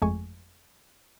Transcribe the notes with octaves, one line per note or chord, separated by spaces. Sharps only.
G1 F2 G#3 A3 G#5 C#6